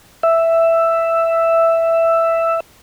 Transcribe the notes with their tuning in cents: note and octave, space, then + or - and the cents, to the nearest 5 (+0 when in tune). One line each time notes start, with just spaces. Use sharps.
E5 +5